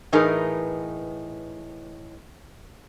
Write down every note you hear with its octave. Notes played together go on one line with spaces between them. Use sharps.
A2 E3 D#4 G#4 A#4 B4